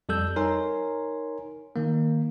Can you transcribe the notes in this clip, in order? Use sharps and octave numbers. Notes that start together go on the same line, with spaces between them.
F2 G3 A4 E6 G6
D#4 A#4 C#5 G#5 C6
D#3 A#3